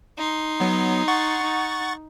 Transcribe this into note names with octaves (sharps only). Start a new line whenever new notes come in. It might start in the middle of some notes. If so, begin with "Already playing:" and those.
D#4 C6
F#3 B3
F#5 C#6 A6
D#4